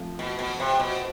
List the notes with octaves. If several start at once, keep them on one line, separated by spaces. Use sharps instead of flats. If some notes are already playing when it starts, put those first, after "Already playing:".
Already playing: F3 A3 C4 F4
B2
B2
C3
B2